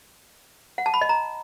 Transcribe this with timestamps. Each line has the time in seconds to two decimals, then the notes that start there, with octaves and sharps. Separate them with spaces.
0.78 F#5
0.86 A5
0.94 B5
1.01 D#5
1.09 A#5